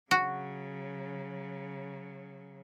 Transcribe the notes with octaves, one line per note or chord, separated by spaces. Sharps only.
C#3 F#3 F#4